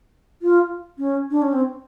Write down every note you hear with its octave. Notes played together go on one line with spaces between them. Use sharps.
F4
C#4
D4
C#4
C4